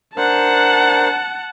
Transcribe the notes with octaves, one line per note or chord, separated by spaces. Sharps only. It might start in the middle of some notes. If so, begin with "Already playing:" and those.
D4 A#4 C5 F#5 A5